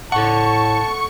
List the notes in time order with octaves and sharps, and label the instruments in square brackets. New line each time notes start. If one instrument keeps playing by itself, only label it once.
[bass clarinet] A2 [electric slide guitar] A4 F#5 [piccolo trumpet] A5 [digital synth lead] C#6